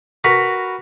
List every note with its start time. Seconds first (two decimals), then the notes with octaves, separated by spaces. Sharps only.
0.24 F#4 A#4 B4 B5